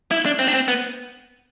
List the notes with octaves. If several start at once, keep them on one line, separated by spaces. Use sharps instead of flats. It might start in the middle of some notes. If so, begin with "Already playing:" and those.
E4
D4
C4
D4
C4
B3